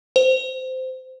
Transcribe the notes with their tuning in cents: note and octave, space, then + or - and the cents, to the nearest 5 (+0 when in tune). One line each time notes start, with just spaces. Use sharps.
C5 -15